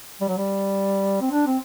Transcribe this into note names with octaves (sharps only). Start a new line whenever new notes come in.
G3
F#3
G3
C4
D4
C4